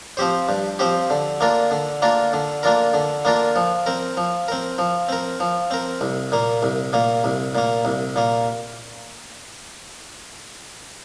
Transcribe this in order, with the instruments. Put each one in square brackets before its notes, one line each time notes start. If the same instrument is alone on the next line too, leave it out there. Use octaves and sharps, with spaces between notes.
[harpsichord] F3 C4 G4 C5
G2
F3 C4 G4 C5
D3
A#3 D4 F4 A#4
D3
A#3 D4 F4 A#4
D3
A#3 D4 F4 A#4
D3
A#3 D4 F4 A#4
F3
C4 A#4
F3
C4 A#4
F3
C4 A#4
F3
C4 A#4
C2
A#2 A#3
C2
A#2 A#3
C2
A#2 A#3
C2
A#2 A#3